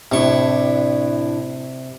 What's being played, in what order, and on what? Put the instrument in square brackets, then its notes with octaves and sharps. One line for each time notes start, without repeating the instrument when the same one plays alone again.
[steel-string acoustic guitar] A2 D4 E4 [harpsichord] C3 C#6